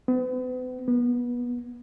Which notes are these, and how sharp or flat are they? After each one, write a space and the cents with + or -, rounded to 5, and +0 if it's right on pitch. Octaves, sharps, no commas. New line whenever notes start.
B3 +40
B3 -25